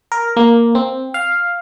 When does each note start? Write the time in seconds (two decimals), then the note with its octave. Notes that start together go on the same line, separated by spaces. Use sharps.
0.12 A#4
0.37 A#3
0.75 C4
1.14 F5